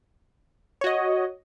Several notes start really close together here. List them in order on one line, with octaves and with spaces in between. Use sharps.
C#5 F#4 D#5